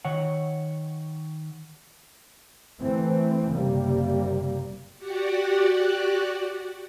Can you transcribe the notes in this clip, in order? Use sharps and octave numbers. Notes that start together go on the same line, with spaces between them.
D#3 C#5 F#5
E3 A3 C4
F#1 C3 G3 A#3
F#4 G4 D5 F#5